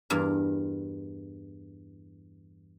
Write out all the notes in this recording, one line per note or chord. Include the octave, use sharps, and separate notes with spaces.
E2 G2 A#4